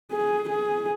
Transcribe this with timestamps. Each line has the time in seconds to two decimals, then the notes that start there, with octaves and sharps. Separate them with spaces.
0.11 G#4
0.49 G#4